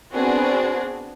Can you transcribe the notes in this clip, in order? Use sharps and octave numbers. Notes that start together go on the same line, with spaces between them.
B3 C4 D4 F#4 G#4